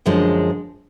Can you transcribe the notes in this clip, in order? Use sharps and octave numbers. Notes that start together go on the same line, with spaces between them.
F#2 D3 F3 G#3